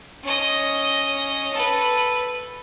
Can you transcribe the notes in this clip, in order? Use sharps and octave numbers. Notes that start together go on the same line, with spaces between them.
C#4 D#5
A4 B4